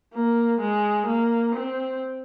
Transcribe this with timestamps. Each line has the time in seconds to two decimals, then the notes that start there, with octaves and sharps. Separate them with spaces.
0.14 A#3
0.60 G#3
1.07 A#3
1.55 C4